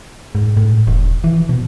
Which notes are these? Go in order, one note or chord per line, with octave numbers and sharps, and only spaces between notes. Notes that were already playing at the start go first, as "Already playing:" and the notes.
G#2
A2
E1
E3
B2